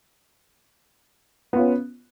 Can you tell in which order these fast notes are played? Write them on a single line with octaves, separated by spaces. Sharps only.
B3 F4 C#4